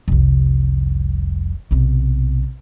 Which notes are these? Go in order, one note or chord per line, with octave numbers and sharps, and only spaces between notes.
F1 C2
B1 C3